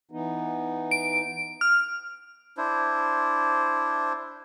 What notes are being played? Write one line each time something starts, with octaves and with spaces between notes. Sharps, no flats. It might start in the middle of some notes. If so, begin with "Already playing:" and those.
E3 B3 D#4
D7
F6
D4 E4 C5